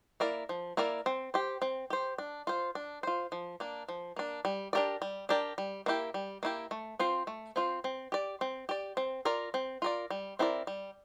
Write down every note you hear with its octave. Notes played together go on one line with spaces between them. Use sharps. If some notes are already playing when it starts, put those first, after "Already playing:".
A#3 E4 A#4 D5
F3
A#3 E4 A#4 D5
C4
G4 C5
C4
G4 C5
D4
F4 C5
D4
F4 C5
F3
A#3 D4
F3
A#3 D4
G3
D4 G4 A#4 D5
G3
D4 G4 A#4 D5
G3
A#3 E4 G4
G3
A#3 E4 G4
A3
C4 F4 C5
A3
C4 F4 C5
C4
G4 D5
C4
G4 D5
C4
F4 A#4 D5
C4
F4 A#4 D5
G3
C4 E4 A#4 D5
G3